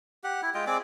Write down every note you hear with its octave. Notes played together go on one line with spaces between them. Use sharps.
G4 F#5
E4
G#3 F4 D#5 G5
C4 G#4 D5 D6